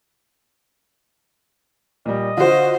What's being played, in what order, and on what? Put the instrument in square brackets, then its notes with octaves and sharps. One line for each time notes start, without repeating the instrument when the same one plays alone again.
[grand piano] A#2 G3 [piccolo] D#5
[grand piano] D3 [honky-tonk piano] F4 F#4 [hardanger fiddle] C5